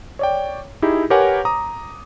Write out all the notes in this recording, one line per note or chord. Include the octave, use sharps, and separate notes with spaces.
C#5 D5 G5
D#4 E4 G4 G#4
G4 A#4 B4 C#5 F#5 G#5
A#5 D6 D#6